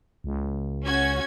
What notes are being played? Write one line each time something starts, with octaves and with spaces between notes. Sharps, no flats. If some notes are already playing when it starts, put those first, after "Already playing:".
C#2
C#4 F#4 G#6